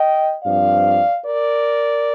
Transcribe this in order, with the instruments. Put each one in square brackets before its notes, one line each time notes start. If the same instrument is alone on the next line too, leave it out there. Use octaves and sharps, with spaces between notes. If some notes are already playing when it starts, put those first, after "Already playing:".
Already playing: [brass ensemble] D#5 G5
G2 F3 C4 D5 F5
A#4 D5